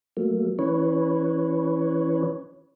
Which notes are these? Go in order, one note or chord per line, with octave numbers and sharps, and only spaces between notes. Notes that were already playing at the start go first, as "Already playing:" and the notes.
F#3 A3 A#3
E3 C#4 B4 C#5